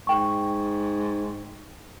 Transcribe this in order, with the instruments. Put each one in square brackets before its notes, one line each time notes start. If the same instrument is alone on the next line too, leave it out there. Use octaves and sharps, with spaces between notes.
[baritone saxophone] G#2 [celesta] G5 C#6